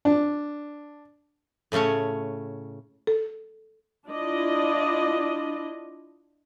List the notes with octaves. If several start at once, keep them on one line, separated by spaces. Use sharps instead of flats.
D4
A2 C#3 A3 C#4 C#5
A4
D4 E4 F4 D5 D#5